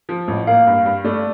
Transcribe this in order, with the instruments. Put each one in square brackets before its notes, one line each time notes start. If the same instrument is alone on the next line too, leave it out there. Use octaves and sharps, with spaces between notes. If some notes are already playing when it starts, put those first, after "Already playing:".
[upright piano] F3
A1
[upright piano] A#3 [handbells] F5
[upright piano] G2
G2
[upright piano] A3 [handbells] D5